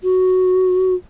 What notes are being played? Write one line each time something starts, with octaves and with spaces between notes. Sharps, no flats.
F#4